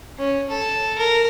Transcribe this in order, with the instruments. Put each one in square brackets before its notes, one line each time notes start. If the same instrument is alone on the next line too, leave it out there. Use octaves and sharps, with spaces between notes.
[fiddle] C#4
A4
A#4